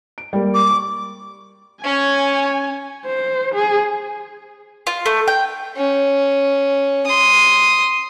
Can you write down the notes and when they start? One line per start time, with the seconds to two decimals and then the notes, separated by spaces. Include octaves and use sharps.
0.18 D7
0.33 G3 A#3
0.54 D6
0.71 C#6
1.84 C#4 C#5 G#5
3.06 C5
3.54 G#4
4.87 F4
5.06 A3
5.28 G5
5.76 C#4
7.06 C6 D#6